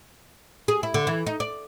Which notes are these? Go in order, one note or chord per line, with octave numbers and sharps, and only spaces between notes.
G#4
E4
D3
E3
D#4
D5